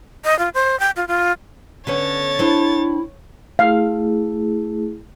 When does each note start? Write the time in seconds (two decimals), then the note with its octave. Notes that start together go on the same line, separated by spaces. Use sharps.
0.25 D#5
0.39 F4
0.54 C5
0.80 G5
0.96 F4
1.08 F4
1.87 D3 B3 C#4 C#5 A6
2.39 C4 D4 E4
3.59 A3 E4 G#4 F5